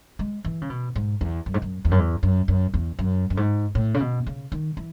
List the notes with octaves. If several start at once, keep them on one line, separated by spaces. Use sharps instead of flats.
G#3
E3
C#3
B2
G#2
E2
F#2
G#2
F#2
E2
F#2
E2
F#2
F#2
E2
F#2
F#2
G#2
A2
C#3
B2
C#3
D#3
E3